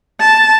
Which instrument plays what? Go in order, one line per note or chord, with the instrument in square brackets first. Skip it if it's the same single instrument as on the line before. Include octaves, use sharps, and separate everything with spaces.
[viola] A5